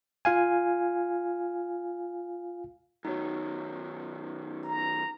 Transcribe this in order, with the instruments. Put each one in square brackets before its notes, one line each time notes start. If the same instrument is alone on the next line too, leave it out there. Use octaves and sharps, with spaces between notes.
[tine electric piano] F4 F5 G#5
[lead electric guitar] F#2 D#3 [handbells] D#4 F#4 C#5
[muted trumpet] A#5